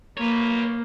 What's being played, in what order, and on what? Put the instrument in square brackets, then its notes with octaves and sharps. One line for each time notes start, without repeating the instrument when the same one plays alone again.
[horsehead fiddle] A#3 [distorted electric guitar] B4 C#5